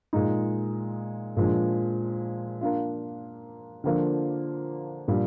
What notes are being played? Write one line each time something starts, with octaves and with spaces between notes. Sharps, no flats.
A#2 G#3 D#4
A#2 F3 G#3 D4
A#3 D4 F4
D3 F3 A#3 D4
A#2 G3 D4